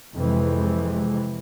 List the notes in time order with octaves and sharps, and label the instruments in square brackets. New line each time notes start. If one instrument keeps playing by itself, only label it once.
[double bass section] F2 C3 E3 G#3